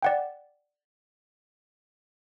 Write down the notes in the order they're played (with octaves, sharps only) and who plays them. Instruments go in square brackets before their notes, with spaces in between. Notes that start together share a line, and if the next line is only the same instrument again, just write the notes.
[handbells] D5 F#5 G5